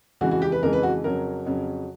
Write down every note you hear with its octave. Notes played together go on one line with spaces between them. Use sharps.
F2 C#3 E3 G#3 F#4
F#4
G4
B4
F2 C#3 E3 G#3 A#4
B4
F#4
F2 C#3 F#3 A#4
F2 C#3 F#3